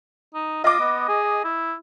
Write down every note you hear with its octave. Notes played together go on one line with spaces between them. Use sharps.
D#4
F4 D#5 D6
B3
G#4
E4